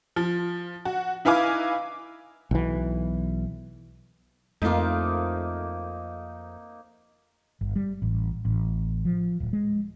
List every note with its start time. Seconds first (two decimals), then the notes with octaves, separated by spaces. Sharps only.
0.16 F3
0.85 F#4
1.25 D#4 E4 B4 F5 G#5 D6
2.51 B1 E3
4.62 F2 A3 A#3 C4 D#4 F4
7.61 G1
7.76 G3
8.02 A1
8.45 A1
9.05 F3
9.40 D1
9.53 G#3